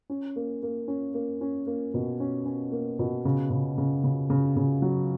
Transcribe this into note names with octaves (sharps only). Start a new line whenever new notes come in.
C#4
A#3
A#3
C#4
A#3
C#4
A#3
B2
C#4
C#4
A#3
B2
C#3
C#3
C#3
C#3
C#3
C#3
F#3